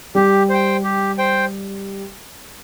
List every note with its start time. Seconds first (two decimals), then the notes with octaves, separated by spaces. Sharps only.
0.15 G3 G4
0.49 C5 G5
0.84 G4
1.18 C5 G5